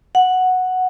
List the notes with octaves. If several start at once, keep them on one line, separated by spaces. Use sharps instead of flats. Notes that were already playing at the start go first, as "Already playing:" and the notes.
F#5